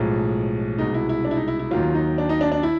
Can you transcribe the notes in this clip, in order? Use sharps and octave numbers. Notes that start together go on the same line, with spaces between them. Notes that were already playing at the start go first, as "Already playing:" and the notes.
Already playing: B1 A2 F3 G#3
C2 B2 G#3 D#4
E4
E4
D4
E4
D#4
E4
E4
D#2 D#3 F#3 F4
D#4
D4
D#4
D4
D4
E4